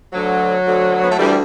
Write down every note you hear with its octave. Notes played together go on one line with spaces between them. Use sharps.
D2 D3 F#3
D2 D3
B3
A3
D2 D3 E3 G3